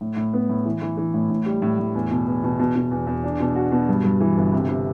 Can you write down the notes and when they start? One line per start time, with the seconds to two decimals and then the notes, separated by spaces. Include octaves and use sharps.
0.01 A2
0.16 A2
0.34 B3
0.49 A2
0.66 E3
0.82 E3
0.97 E3
1.14 A2
1.30 A2
1.46 G3
1.62 A2
1.79 A2
1.95 E2
2.11 B2
2.27 E2
2.44 B2
2.59 B2
2.75 B2
2.91 E2
3.07 E2
3.24 D4
3.40 B2
3.55 F#4
3.72 B2
3.89 G2
4.04 G2
4.20 E3
4.37 G1
4.53 C3
4.69 C3